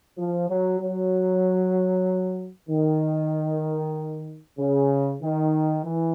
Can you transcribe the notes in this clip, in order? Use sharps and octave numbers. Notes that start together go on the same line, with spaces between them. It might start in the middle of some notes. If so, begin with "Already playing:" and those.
F3
F#3
F#3
D#3
C#3
D#3
E3